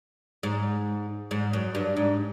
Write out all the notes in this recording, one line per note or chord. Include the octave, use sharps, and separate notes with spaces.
G#2
G#2
F#2
G2
G#2